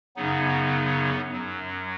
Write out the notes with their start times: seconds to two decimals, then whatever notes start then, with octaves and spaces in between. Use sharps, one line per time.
0.16 F#2 C#3 F#3 B3 D#4
1.32 F#2 F#3